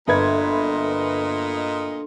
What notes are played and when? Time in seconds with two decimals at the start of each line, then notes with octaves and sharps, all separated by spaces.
0.08 G1 A#2 D4 A4 B4 D#5 C6 G#6